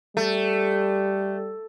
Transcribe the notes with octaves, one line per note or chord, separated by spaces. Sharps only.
G3 A3